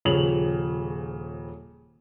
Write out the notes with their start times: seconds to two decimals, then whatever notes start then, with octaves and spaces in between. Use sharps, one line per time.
0.05 D#1 C#3 F3 C#5 F7 F#7